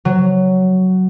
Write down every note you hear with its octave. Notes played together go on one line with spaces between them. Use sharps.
F#3